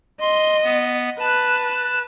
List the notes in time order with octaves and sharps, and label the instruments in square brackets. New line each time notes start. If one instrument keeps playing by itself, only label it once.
[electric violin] D#5 [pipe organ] C6
[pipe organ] B3
[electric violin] B4 [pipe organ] A5 F#6